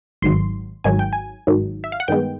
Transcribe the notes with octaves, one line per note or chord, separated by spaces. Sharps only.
G#1 G#2 D#3 F#3 C6
G#1 G#2 D#3 F#3 G#5
G5
G#5
G#1 G#2 D#3 F#3
E5
F5
F#5
G2 D#3 G#3 B3 G5